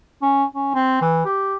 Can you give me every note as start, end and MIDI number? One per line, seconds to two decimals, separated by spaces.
0.22 0.44 61
0.54 0.74 61
0.75 0.99 60
1.02 1.24 52
1.26 1.56 67